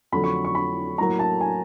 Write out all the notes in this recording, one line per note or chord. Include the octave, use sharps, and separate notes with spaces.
F2 D3 F#3 A3 B5
C#6
C#6
B5
A2 F#3 A#3 A#5
A5
G#5